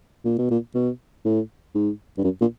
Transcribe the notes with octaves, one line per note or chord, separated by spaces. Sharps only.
A#2
B2
A#2
B2
A2
G#2
G2
F#2
A#2